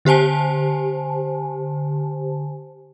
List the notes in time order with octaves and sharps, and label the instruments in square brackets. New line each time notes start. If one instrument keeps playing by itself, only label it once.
[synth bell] D3 G4 C5 G#5 A5